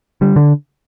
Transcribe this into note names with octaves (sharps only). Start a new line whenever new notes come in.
D3 G3
D3